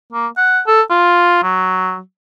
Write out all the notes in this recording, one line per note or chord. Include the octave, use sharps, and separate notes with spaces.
A#3
F#5
A4
F4
F#3